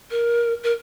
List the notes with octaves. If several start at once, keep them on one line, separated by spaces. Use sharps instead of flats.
A#4
A#4